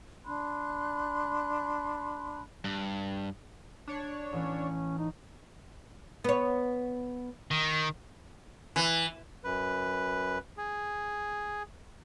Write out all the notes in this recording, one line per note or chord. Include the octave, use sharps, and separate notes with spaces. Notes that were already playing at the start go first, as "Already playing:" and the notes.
D4 B5 C6 F#6
G2
D4 C#5
A1 E3 C#4
D#4
B3 C#5
D#3
E3
F#2 B4
G#4